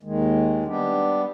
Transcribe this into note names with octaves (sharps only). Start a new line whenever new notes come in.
D#2 D#3 G#3
G3 B3 D4 G4